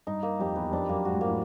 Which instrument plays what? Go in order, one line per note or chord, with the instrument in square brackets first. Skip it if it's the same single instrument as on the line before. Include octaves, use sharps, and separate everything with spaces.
[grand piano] G2 [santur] D#4
[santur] A#3
[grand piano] F2 [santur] G4
[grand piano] E2 [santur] B4
[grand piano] F2 [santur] D4
[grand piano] F#2 [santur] A#3
[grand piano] G#2 [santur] F#4
[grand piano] A2
[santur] A#3
[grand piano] A2